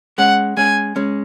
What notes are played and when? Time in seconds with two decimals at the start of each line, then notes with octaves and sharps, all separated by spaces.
0.18 G#3 C#4 F#5
0.57 G#3 C#4 G#5
0.96 G#3 C#4